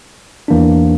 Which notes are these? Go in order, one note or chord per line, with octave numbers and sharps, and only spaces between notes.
E2 E3 A#3 D4